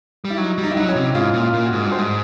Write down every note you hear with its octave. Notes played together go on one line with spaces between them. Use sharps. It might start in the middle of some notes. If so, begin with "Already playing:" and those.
G3
E4
F#3 D#4
G3
D#4
E4
F#3 D#4
C#4
C3
G#2 F4
A#2
F4
A#2
F#4
G#2
G2
C5
G#2